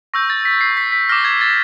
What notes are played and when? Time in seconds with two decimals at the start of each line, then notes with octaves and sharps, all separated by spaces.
0.14 C#6 E6 G6 A#6
0.30 A6
0.45 B6
0.61 C7
0.77 B6
0.92 B6
1.09 D6 F6 A#6
1.25 G#6
1.41 A6